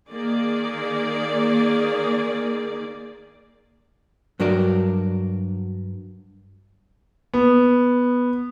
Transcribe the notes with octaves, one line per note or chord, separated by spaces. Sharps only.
D#3 A#3 G#4 D5
G2 F#3 D4 F#4 A#4 D5
B3